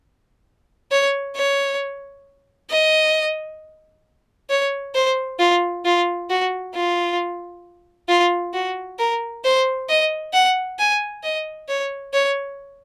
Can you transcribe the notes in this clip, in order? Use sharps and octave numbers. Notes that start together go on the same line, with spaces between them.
C#5
C#5
D#5
C#5
C5
F4
F4
F#4
F4
F4
F#4
A#4
C5
D#5
F#5
G#5
D#5
C#5
C#5